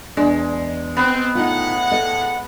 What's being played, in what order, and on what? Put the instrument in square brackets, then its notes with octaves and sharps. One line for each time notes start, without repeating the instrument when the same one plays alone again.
[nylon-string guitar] E2 D4 [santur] G#3
[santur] B3 [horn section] C4
[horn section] A2 F#5 [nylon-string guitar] D#4 F4
[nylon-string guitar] A4 D#5